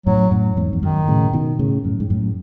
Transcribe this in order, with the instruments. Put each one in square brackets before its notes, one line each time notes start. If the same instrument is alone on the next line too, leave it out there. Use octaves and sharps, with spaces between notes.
[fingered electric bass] F#2 A2 [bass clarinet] F#3
[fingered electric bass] F#2 A2
E2 G#2
E2
[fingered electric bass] F#2 [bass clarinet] D#3
[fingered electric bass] A2 C#3
B2 D#3
A2 C#3
F#2 A2
G#2
F#2 A2